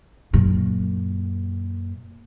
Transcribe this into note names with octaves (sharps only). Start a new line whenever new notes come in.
F#2 A#2